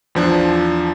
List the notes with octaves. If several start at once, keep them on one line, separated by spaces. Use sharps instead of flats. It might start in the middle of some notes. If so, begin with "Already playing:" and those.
E2 F3 D4